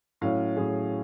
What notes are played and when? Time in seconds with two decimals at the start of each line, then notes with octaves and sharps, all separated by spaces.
0.21 A2 F#3 C#4 F5
0.56 A2 F#3 C#4 G#4